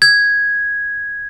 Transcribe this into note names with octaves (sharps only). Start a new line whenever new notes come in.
G#6